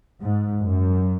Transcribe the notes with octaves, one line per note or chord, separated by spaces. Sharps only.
G#2
F#2